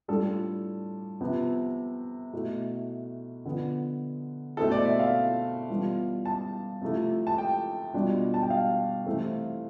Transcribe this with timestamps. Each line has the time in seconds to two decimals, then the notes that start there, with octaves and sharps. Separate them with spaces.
0.08 A2 G3 D4 F4 A4
1.21 C3 F3 B3
2.33 B2 A3 E4
3.45 D3 F3 B3
4.57 B2 A3 C4 E4 A4
4.72 D5
4.85 E5
4.99 F5
5.70 E3 G3 B3 F4
6.25 A5
6.82 C3 F3 A3 E4
7.27 A5
7.38 G5
7.94 B2 G3 D4 F4
8.34 A5
8.42 G5
8.50 F5
9.06 C3 E3 A3 C4